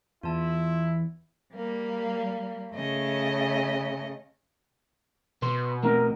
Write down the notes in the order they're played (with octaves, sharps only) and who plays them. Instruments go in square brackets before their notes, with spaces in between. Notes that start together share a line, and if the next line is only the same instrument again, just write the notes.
[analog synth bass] E2 [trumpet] E4 [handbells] F4 A5
[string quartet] G3 A#3
C#3 A3 D#5
[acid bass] B2 [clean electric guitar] B3 C6
[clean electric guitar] A3 C4 D#4 [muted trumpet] A#4